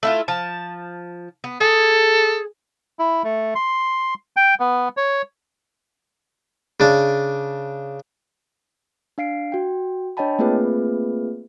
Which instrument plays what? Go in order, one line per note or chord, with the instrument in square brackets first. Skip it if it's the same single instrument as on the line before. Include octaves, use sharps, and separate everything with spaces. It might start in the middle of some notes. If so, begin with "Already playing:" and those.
[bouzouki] A3 E4 F4
F3 A5
B3
[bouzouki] G#4 [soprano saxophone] A4
[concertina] E4
A3
C6
G5
B3
C#5
[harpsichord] C#3 D4
[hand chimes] D4 F5 C7 D7
F#4 G5
D4 C#5 D#5 G5 A5 B5
A3 A#3 C4 F4 G#4 B4